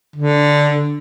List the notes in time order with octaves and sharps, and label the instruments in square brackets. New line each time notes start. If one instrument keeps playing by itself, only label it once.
[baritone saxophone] D3